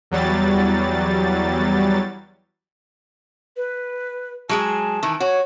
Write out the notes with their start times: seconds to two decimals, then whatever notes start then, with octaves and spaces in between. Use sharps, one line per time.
0.11 E2 F#3 G3 A6
3.57 B4
4.49 F#3 G#3 G#4 A5
5.03 D#3 E3
5.20 F#4 C#5